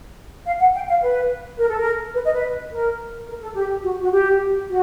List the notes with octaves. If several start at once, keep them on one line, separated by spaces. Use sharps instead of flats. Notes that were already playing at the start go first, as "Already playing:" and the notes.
F5
F#5
G5
F5
B4
A#4
A4
A#4
B4
D#5
B4
A#4
A#4
A4
G4
F#4
F#4
G4
F#4